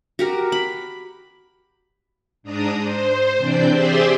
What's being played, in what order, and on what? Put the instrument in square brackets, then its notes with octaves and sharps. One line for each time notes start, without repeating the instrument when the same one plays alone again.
[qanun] F#4 G4 A#4
B5
[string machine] G#2 D4 A#5 D#6
C5
C3 E3 C4 D4 D5 G6
G4 G#4 C5 D5 E5 C6